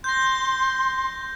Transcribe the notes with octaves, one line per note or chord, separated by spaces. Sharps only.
C6 G6 A#6